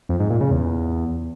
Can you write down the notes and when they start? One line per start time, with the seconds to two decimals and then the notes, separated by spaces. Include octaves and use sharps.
0.09 F2
0.20 G#2
0.30 A#2
0.41 C#3
0.51 E2